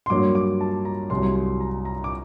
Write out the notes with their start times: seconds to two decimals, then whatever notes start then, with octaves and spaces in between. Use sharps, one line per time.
0.06 C6
0.10 G2 F#3 A#3 D6
0.35 D6
0.61 A5
0.85 A#5
1.10 C2 C3 F#3 C6
1.35 C6
1.60 A#5
1.85 A#5
2.04 D6